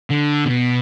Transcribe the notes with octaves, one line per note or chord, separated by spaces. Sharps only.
D3
B2